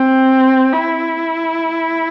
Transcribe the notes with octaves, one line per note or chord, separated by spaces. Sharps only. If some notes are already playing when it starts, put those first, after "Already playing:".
Already playing: C4
E4